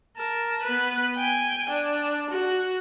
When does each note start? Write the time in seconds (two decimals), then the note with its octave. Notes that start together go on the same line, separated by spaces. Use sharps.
0.17 A#4 A5
0.63 B3 B4
1.16 G5 G#5
1.70 D4
2.30 F#4